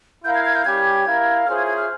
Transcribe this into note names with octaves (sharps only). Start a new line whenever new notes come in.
E4 A#4 F5 G6
G#6
G#6
G6
G3 C#4 G4 G#6
E4 A#4 F5
C#4 F4 G#4 C5 E5 F6
G#6
G#6
F6